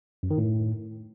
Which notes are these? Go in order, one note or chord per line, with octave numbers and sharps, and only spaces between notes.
F#2
D#3
A2